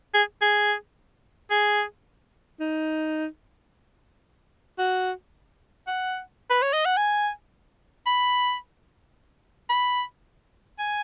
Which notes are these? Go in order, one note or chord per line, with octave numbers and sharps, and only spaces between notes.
G#4
G#4
G#4
D#4
F#4
F#5
B4
C#5
D#5
F#5
G#5
B5
B5
G#5